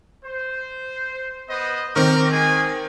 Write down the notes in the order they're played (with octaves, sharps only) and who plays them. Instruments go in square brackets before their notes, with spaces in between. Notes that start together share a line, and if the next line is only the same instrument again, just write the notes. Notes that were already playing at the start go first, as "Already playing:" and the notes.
[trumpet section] C5
B3 C5 D#5
[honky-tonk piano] D#3 C4 [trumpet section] A#4 D6
[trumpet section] G#3 G#4 G#5